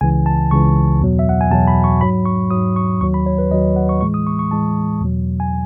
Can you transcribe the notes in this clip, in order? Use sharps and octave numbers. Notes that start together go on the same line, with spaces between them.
C#2 C#3 E3 G#5
A5
C#2 C#3 E3 C#6
E2 B2 F#3
E5
F#5
G#5
E2 B2 F#3 A5
B5
C#6
G#2 F#3 B5
C#6
G#2 F#3 D#6
C#6
D#2 D#3 F#3 C#6
B5
C#5
B4
D#2 D#3 F#3 D#5
F#5
C#6
A2 E3 G#3 C#6
D#6
C#6
C#6
A2 E3 G#3 A5
E2 B2 F#3
G#5